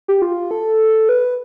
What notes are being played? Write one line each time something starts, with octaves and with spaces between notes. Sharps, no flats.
G4
F4
A4
B4